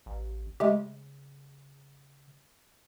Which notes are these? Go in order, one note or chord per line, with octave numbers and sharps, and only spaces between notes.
A1
C#3 G#3 A3 G4